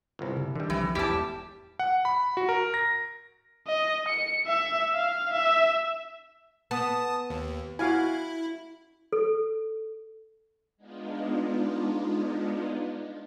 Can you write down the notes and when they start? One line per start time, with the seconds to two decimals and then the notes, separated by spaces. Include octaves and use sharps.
0.19 G1 C2
0.37 C#3
0.55 D3 D#3 G3
0.70 C2 E3 F3
0.95 E1 A1 E2 G3 E4 G4 A5
1.79 F#5
2.05 B5
2.37 F#4
2.49 A#4
2.74 A#6
3.67 D#5
4.08 C#7
4.46 E5
4.95 F5
5.31 E5
6.71 B3 A5 D#6
7.30 D#2
7.79 E4 F#4 F5 G#5
9.12 A4
10.77 G#3 B3 D4 D#4 F4